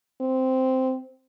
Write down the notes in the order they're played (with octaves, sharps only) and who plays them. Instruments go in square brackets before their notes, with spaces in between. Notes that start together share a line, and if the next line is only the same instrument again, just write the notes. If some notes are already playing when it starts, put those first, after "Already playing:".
[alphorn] C4